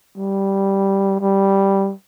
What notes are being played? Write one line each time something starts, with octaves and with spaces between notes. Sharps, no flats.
G3
G3